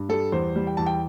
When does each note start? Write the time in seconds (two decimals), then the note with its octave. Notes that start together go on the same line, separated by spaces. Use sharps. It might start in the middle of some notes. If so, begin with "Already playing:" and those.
Already playing: G2
0.09 G3 A4
0.32 E2 C5
0.56 G3
0.67 G5
0.77 E2 A5
0.86 G5